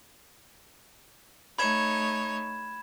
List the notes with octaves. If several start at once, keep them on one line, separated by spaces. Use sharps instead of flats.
A3 D#4 C#5 B5 G#6 E7